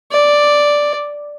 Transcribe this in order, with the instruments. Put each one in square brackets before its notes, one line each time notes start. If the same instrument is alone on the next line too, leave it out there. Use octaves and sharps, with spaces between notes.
[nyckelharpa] D5